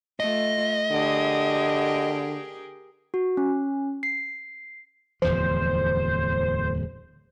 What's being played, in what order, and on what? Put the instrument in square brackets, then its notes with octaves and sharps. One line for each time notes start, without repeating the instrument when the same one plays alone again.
[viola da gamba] A3 F4 [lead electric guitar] D#5
[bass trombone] D3 [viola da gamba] G4 G#4 A#4
[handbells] F#4
C#4
C7
[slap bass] D1 E2 F3 [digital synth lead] C5